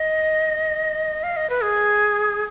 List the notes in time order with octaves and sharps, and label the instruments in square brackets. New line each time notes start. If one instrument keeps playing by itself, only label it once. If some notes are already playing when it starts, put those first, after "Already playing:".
Already playing: [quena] D#5
F5
D#5
B4
G#4